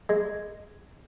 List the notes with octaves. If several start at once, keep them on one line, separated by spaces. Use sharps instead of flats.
G#3